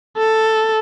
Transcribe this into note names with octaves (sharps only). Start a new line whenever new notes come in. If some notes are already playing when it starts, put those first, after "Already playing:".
A4